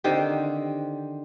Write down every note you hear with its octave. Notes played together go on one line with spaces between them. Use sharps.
D3 D#3 C4 G4